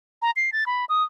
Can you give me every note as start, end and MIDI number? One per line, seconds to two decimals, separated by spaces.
0.22 0.31 82
0.36 0.50 96
0.53 0.64 93
0.67 0.85 83
0.89 1.03 87